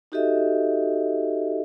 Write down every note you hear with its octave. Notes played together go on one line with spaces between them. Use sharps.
D#4 F#4 G4 A4 D#5 E5